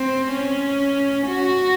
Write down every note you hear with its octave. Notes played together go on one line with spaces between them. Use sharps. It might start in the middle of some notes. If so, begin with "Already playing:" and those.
Already playing: C4
C#4
F#4